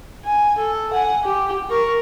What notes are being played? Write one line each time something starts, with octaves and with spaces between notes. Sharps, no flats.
G#5
A4
F#5 G#5
G4
A#4 C#6